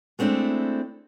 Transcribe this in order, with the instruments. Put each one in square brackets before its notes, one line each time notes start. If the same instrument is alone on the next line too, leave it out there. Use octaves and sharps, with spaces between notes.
[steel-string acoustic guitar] G#3 A3 C4 D4 E4